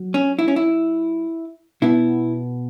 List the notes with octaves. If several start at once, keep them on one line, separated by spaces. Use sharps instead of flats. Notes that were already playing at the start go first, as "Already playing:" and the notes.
Already playing: F#3
C#4
E4
C#4
E4
B2 B3 E4